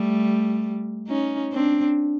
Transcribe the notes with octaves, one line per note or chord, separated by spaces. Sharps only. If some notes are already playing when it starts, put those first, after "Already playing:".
Already playing: G3 A3
C#4 D#4
C4 D4